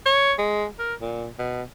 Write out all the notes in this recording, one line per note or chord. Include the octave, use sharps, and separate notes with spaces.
C#5
G#3
A#4
A#2
B2